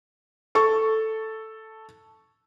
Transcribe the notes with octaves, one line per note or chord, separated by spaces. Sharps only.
A4 C#6